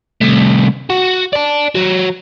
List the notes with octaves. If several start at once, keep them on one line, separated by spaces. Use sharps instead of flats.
C2 A3
F#4
D5 A5
F#3 F#4